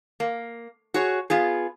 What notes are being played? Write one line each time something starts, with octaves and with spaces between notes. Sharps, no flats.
A#3
F#4 G#4 C#5
B3 F4 G#4